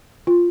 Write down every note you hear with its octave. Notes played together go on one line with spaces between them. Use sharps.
F4